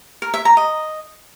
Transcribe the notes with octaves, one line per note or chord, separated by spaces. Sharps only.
A#4
E5
A#5
D#5